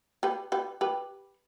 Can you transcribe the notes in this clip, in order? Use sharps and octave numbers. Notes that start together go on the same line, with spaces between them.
G4 B4
G4 B4
G4 B4